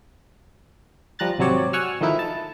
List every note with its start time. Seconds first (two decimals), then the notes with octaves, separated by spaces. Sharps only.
1.19 F3 G3 A#5 F#6 A6
1.38 G#1 C3 F#3 C4 C#5 D5
1.73 F#5 G#5 C#6 E6 F6
2.01 D#3 F3 A3 D#4 E4
2.19 A5